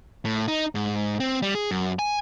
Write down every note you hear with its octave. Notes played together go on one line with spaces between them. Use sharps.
A2
D#4
G#2
C4
G3
G#4
F#2
G#5